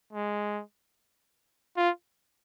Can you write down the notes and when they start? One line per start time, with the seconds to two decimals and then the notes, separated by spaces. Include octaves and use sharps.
0.13 G#3
1.77 F4